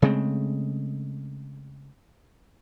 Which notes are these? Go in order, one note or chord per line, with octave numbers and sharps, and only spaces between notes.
C#3 G#3 A3 C4